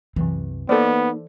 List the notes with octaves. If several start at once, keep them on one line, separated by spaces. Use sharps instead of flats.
C2 F#2 C3 E3
A#3 B3 D#4 A4 C5 D5